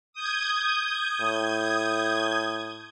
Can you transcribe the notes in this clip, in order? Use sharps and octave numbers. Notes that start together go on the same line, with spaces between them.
D#6 G6 G#6
A2